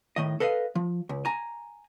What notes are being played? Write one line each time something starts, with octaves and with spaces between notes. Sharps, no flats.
A2 D#3 D#5
A4 B4 D#5 F5
F3
C#2
G#5 A#5